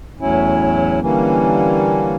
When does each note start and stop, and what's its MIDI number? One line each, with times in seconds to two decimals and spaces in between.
0.20 1.00 40
0.20 1.00 45
0.20 1.00 54
0.20 1.00 61
0.20 1.00 64
1.01 2.16 50
1.01 2.16 52
1.01 2.16 55
1.01 2.16 58
1.01 2.16 61